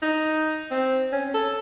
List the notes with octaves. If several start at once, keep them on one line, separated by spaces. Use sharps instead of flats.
D#4
C4
C#4
A4